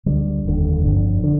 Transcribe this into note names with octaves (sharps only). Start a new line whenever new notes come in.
D2 D3 G3
F1 D#2 D3
G1 F2 D3
D3